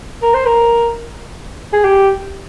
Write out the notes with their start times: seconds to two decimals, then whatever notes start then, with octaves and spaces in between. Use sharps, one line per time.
0.22 A#4
0.34 C5
0.46 A#4
1.73 G#4
1.84 G4